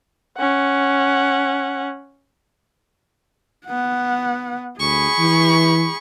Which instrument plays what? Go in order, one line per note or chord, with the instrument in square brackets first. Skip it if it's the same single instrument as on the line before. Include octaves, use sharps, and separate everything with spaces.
[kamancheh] C#4 F#5
[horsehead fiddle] B3 F#5
[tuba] D2 [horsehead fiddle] G#4 B5 [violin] C#6
[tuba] E3